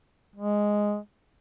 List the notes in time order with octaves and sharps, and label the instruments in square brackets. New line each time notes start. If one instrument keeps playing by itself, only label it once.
[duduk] G#3